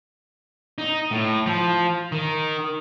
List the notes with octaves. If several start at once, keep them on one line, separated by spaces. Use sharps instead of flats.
D#4
A2
F3
D#3